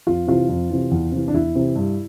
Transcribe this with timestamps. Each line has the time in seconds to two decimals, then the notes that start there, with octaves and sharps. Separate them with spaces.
0.07 F2 F4
0.27 C3 E3 F4
0.49 F2
0.70 C3 E3
0.91 E2
1.12 C3 E3
1.28 D4
1.34 E2 E4
1.55 C3 E3
1.76 G2